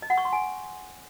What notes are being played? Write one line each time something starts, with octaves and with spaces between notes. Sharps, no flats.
D#5
F#5
C#6
C6
G#5